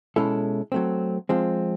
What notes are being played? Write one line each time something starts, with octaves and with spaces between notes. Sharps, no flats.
B2 G#3 C#4 E4 A4
F#3 A3 C4
F3 G#3 C4